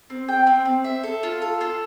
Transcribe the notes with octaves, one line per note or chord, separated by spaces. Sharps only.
C4
G5
C4
C4
E5
A4
F4
A4
F4